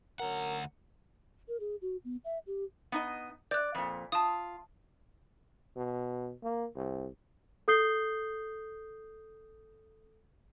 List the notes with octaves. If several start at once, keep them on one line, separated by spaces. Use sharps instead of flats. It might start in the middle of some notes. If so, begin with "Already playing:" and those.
D2 F#3 C#4 A#4 F#5
A#4
G#4
F#4
B3
E5
G4
B3 D#4 D#5
D5 F#6 G6
F2 A#2
F4 A5 D#6
B2
A#3
C2
A4 D#6 G6 C7 G7